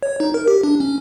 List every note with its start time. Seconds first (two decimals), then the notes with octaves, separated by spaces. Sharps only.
0.03 C#5
0.20 D#4
0.34 A#4
0.48 G4
0.63 D4
0.80 C#4